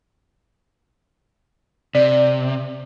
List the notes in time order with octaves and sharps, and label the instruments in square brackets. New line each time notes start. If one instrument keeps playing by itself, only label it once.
[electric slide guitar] C3 [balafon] D5